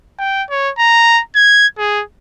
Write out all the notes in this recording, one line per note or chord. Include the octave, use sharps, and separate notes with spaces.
G5
C#5
A#5
G#6
G#4